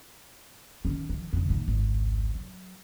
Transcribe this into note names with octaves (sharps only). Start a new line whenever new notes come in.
D#3 C#4
D#3 F3
F2 C#3
A#2 D#3
G#1 C#2
F#3